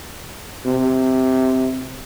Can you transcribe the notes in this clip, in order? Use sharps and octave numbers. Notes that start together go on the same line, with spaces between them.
C3